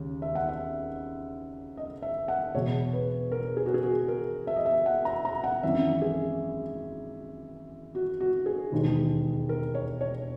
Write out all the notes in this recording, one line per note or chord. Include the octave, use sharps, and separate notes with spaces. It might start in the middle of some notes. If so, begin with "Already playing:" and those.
Already playing: D#2 C#3 G#3
E5
F#5
E5
D#5
E5
F#5
E2 B2 G#3 C#5
B4
A#4
G#4
F#4
G#4
F#4
A#4
E5
D#5
E5
F#5
A#5
A#5
F#5
G#1 F#2 E3 E5
G#4
F#4
F#4
G#4
E1 D#2 D#3 G#3
A#4
C#5
C#5